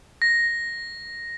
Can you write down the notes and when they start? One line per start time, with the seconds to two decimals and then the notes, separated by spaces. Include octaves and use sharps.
0.22 A#6